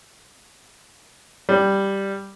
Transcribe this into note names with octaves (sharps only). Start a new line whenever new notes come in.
G3